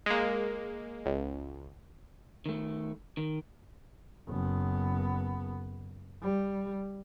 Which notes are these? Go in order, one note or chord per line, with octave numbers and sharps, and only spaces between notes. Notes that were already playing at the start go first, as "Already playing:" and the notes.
G#3 A#3
C#2
D#3 A3
D#3
F#1 B3
G3